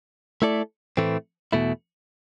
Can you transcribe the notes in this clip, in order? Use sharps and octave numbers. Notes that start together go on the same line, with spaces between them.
A3 E4 A4 D5
A2 E3 A3 C4
E2 B2 A3 E4